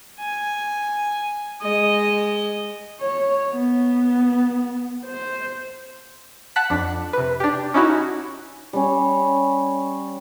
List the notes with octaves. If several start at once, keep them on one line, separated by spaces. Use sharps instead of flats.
G#5
G#3 D#5
C#5
B3
C5
F#5 A5 F#6 B6
F2 D4
C3 B4
D4 G4
C#4 D#4 E4 F#4
G3 C#4